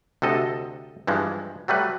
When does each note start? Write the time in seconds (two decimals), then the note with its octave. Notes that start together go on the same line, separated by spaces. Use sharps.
0.22 D2 C3 A4 D#5
1.07 G2 E3 F3 G#3
1.68 F#3 G3 A3 B4